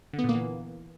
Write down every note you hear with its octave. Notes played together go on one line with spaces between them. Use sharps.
D3
B3
A#2
A#3
E3